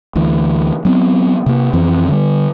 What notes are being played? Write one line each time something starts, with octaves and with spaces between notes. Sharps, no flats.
D2 E3
F#3 B3 C4
C3 A#3
F2 E3 C4
D3 G3